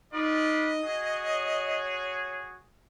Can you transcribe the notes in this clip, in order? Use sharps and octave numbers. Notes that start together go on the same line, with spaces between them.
D#4 F4 B4 D5 D#5
F#4 G#4
C#5